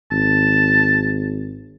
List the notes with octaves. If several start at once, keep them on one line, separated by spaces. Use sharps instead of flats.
G#1 A5